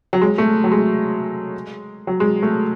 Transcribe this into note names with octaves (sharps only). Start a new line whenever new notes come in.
F#3
G#3
A3
F#3
G#3
F#3
G#3
A3